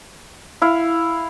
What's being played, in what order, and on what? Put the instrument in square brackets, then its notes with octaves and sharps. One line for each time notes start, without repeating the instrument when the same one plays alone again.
[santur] E4 F5